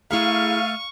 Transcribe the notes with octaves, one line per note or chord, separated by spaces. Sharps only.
A3 E4 G#4 F5 A#5 C#6 F6 D#7